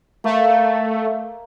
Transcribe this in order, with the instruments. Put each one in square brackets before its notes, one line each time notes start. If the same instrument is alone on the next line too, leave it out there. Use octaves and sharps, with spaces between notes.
[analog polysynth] A3 [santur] A#3